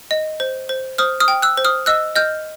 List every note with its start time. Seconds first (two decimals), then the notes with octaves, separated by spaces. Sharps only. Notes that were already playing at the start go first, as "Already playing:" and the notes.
0.11 D#5
0.40 C5
0.69 C5
0.98 C5 D#6 F6
1.20 D#6 F6
1.28 G5
1.42 E6 F#6
1.57 C5
1.65 D#6 F6
1.86 D#5 E6 F#6
2.16 D#5 F6 G6